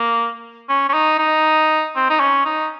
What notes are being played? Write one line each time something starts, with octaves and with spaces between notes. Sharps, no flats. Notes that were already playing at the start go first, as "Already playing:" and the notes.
Already playing: A#3
C#4
C#4
D#4
D#4
C4
D#4
C#4
D#4